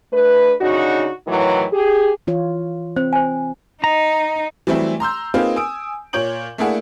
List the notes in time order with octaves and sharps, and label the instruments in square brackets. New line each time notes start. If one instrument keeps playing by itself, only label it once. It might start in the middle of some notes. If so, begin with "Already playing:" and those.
[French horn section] A3 D4 B4
C#3 D4 D#4 F#4
A2 D#3 E3 F#3
G4 G#4
[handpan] E3 F4 C#5
[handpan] C4 [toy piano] C5
[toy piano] C5 G#5
[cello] D#4 [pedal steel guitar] A#5
[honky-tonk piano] E3 F#3 G3 A3 C4 E4
A#5 C6 E6 G6
A#3 C4 D#4 F4 G#4 B4
G#5 D#6 E6 D7
A#2 C#5 G6 D7 F#7
A3 A#3 D4 E4 G#4 F#5